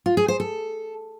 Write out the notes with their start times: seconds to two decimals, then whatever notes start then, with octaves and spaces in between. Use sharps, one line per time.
0.06 F4
0.17 G#4
0.28 C5
0.40 A4